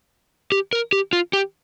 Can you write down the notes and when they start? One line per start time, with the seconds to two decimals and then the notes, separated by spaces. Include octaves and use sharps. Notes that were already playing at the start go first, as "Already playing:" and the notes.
0.52 G4
0.73 A#4
0.93 G4
1.13 F4
1.33 G4